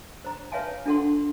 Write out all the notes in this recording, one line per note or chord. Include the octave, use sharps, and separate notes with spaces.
C5 A#5
B4 C#5 E5 F5 G#5 A5
D4 F4 A4 F#5 C6